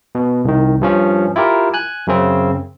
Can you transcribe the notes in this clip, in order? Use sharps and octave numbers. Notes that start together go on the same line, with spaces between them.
B2
C2 D#3
G2 F3 C#4
E4 F4 G4 A#4
G#5 F#6
F#2 C#3 C4